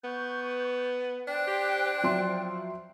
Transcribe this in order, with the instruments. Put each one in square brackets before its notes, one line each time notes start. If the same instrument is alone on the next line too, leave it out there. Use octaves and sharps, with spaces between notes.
[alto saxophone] B3 [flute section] C#6 G6
[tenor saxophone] D4 [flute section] C5 G5 F#6
[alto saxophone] G4
[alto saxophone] F3 [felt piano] F#3 E5 C6